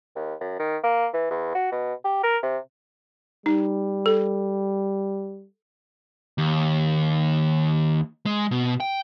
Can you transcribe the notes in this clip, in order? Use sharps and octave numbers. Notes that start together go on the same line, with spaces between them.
D#2
F#2
D#3
A#3
E3
E2
F#4
B2
G4
A#4
C3
G3 D#4
A4
D#2
G#3
B2
G5